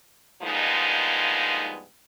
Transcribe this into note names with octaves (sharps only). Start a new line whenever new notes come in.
G2 F3 G#3 A#3 B3 D#4